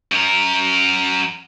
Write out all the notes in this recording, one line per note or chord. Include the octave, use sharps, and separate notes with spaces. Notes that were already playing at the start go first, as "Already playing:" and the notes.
F#2 A#4